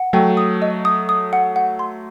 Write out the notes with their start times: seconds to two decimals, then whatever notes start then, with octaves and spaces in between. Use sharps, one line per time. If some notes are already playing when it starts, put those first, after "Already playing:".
Already playing: F#5
0.13 F#3 A3 G5
0.37 D#6
0.62 D#5
0.85 D#6
1.09 D#6
1.33 F#5
1.56 F#5
1.79 C6